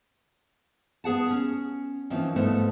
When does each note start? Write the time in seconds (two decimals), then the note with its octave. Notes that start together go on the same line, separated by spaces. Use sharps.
1.04 B3 G#4 F#5 A5
1.31 C#4
2.10 E3 F3 A#3 C4 C#4 D#4
2.36 G#2 F3 A3 B3 D#4 E4